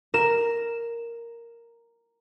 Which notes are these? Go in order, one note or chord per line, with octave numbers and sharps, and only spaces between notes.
A#4 E7